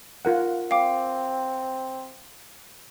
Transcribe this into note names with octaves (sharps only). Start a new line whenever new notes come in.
F4 A#4 F#5
C4 F5 G5 D6